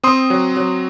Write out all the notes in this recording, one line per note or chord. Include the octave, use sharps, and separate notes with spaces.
C4 C6 D#6
F#3
F#3